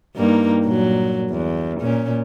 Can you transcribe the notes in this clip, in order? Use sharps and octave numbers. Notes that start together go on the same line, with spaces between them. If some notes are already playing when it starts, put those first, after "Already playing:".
G2 A#3 D#4
A#2 F#3
E2
A#2 C#4